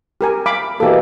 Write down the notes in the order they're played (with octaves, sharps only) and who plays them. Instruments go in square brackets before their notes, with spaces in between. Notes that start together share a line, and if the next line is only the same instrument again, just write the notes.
[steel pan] G4 A#4 G#5
F5 B5 D6
[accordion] B2 E3 A#3 [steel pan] G4 A4